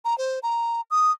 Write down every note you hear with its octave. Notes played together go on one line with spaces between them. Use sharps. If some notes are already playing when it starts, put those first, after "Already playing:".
A#5
C5
A#5
D#6